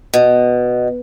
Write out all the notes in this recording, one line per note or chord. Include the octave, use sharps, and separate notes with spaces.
B2